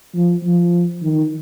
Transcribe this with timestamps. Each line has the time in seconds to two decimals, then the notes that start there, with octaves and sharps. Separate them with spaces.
0.14 F3
0.43 F3
1.02 D#3